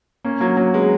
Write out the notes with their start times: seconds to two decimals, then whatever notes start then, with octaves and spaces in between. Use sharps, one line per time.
0.24 A#3 C#4
0.40 F#3 A#3
0.57 F#3 A#3
0.73 G#3 B3